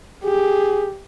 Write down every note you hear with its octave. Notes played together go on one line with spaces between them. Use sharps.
G4 G#4